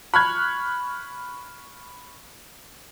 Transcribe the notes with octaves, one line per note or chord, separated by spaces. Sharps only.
B5 C#6 F6 F#6 G#6